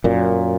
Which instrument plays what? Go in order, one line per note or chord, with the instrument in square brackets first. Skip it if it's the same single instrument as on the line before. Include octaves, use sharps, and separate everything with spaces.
[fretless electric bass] F#2 A#2